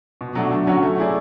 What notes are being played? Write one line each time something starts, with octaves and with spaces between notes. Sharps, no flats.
B2
F#3 A3 D4 F#4
D3
F#3 C#4 F#4 C#5
A3
E4 G#4 D5